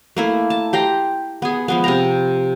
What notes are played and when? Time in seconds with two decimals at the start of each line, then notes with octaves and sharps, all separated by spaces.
0.17 A3 A#3 E4
0.50 A5
0.73 G4 G5 A#5 C6
1.42 B3 G#4
1.68 F3 G#3 B3
1.84 C3 G5 A#5